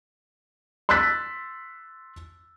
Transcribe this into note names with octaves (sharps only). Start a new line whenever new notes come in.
C6 E6 F#6 A6 B6